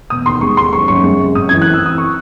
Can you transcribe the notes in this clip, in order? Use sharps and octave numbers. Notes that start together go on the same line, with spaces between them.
E1 D#6
D#2 C6
G#3 C#6
D#2 C6
F#1 C#6
F#2 C#6
G#3
C3
F#2 D#6
E3 G#6
C4 F#6
E6
E3 D#6
C#6